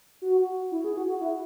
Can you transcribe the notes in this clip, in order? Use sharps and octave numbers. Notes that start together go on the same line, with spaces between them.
F#4
E4
G#4
F#4
F#4
E4